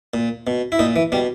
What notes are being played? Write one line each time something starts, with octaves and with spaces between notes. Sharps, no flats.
A#2
B2
E4
A#2 D#4
E3
B2 G3